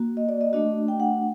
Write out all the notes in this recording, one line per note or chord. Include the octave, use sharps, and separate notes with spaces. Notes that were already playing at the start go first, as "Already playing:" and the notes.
Already playing: A#3 F#4
D#5
D5
D#5
A3 D4 F#4 D#5
G5
F#5